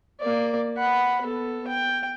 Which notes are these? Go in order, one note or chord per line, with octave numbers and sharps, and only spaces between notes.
A#3 D5
F#5 B5
B3 A4
G5